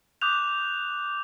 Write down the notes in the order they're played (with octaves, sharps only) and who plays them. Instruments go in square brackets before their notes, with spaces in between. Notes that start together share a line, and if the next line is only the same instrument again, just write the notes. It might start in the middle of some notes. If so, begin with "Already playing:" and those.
[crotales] D6 D#6 F#6 G6 F7